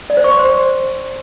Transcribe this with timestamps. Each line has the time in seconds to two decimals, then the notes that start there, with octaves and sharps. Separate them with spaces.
0.10 D5
0.17 C5
0.24 C#6
0.32 C6
0.39 C5